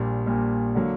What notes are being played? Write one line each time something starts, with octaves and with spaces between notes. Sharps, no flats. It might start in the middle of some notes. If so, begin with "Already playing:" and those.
Already playing: A#1 A#2 G3
A#1 A#2 G3
D3 F#3 A#3